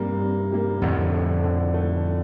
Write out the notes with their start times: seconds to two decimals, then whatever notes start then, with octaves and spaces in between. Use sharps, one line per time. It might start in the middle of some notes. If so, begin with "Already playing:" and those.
Already playing: G2 C3 G3 A#3
0.22 C3
0.52 G3 A#3
0.82 F2 A2 D3
1.13 A3 D4
1.44 D3
1.74 A3 D4